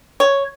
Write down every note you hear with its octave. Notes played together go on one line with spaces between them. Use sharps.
C#5